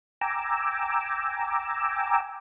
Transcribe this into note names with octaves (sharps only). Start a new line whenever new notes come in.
G5 G#5 A#5 D6 E6